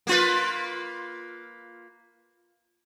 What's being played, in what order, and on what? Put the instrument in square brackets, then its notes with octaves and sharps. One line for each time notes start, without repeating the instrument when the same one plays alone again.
[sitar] A#3 F4 B4